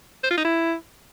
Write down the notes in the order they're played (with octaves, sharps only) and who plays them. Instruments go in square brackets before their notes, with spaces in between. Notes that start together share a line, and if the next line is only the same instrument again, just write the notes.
[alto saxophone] C5
F4
D#4
E4